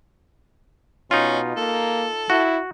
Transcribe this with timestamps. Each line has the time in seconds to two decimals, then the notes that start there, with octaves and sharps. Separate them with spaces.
1.11 B2 C#4 D#4 F4
1.57 A#3 A4
2.30 E4 F#4